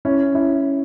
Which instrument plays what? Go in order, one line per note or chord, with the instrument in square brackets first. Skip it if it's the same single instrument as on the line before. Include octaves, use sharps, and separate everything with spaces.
[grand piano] C#4 E4
C#4 E4